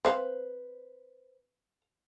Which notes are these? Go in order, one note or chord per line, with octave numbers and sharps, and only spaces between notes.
C4 B4 C5 F5